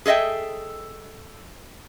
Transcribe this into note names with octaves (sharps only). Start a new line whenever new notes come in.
G#4 A4 D#5 E5 G5